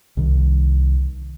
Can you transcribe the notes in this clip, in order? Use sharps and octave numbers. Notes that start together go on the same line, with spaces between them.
C2 C3 D#3